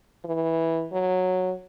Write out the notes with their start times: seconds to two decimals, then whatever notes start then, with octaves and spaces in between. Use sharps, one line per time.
0.24 E3
0.92 F#3